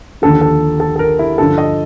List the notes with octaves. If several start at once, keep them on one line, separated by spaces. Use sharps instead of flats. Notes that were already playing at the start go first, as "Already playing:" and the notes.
D#2 D3 F3 A4
A4
A4
A4
A#4
E4
G2 D3 F3 A4
D#5